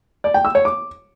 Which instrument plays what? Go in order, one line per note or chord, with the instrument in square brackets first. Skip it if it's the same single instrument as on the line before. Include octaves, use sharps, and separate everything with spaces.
[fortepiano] D5
G5
E6
C#5
D6